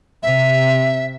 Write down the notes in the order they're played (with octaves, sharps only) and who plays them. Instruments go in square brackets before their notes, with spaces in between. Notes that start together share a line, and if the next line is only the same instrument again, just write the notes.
[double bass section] C3 [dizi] E5